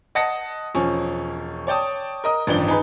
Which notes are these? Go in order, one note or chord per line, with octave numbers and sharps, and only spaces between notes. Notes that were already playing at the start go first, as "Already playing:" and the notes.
D#5 F#5 A5 D#6 A#6 C#7
E1 F3 C#4
C#5 D5 G5 A5 D#6
A#4 D#5 D#6
A1 G2 D#3 F3 D4 G7
D#4 G#4 B4